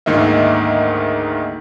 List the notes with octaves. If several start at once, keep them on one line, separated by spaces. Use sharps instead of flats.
D2 G#2 D#3 A#3 D#5 E5